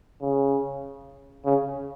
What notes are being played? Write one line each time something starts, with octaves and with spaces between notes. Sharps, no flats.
C#3
C#3